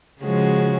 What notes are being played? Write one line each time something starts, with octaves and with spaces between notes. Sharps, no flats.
C#3 F3 G#3 C#4 F#4